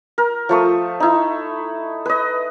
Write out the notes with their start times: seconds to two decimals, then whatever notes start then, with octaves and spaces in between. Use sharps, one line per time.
0.18 A#4
0.49 F3 A3 C#6 D#6
1.00 D#4 E4
2.06 B4 D#5